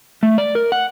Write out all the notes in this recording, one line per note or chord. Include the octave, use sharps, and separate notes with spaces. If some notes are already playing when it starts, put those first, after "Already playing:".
A3
D5
A#4
F#5